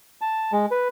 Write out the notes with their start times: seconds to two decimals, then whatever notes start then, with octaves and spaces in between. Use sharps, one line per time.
0.21 A5
0.52 G#3
0.71 B4